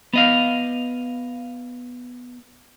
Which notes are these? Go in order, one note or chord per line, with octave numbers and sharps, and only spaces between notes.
B3 D#5 F5